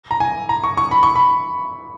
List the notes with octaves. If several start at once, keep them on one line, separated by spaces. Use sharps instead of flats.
A#5
G#5
A#5
C#6
C#6
B5
C#6
B5